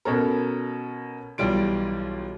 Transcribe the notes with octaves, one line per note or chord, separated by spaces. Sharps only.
B2 C#4 A4 A#4
B1 E3 G3 F4 D7